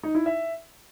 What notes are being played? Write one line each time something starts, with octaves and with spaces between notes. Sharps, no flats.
D#4
E4
E5